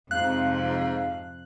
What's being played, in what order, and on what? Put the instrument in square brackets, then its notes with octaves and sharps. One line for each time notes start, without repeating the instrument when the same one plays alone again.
[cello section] F2 C3 [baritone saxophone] G#2 [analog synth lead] F5 [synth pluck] F#6